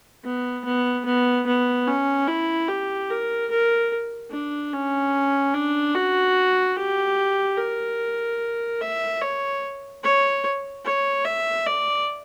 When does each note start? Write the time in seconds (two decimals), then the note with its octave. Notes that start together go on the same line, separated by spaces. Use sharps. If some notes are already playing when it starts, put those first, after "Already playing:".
0.24 B3
0.65 B3
1.05 B3
1.47 B3
1.87 C#4
2.27 E4
2.69 G4
3.10 A#4
3.51 A#4
4.31 D4
4.73 C#4
5.54 D4
5.95 F#4
6.76 G4
7.58 A#4
8.81 E5
9.21 C#5
10.03 C#5
10.85 C#5
11.25 E5
11.66 D5